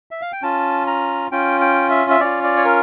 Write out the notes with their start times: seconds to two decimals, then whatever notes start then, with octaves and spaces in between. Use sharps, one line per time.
0.11 E5
0.21 F5
0.32 G5
0.42 C#4 F4 A5
0.87 A#5
1.31 C#4 F4 G5
1.61 G5
1.90 E5
2.10 E5
2.20 C#4 F4 D5
2.44 D5
2.57 C#5
2.65 A#4